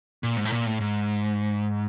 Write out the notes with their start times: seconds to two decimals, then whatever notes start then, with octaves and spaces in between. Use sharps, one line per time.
0.23 A#2
0.37 G#2
0.45 A2
0.52 A#2
0.66 A2
0.81 G#2